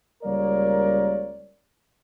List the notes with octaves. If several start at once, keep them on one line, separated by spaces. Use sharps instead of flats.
C#2 G3 A#3 A#4 C#5 D5